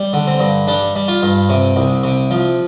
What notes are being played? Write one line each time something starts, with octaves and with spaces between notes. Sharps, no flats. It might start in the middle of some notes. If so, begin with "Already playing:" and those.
Already playing: G3
D3
C4
G2
G3 D4
G3
F4
G2
C3
C2
C3
F3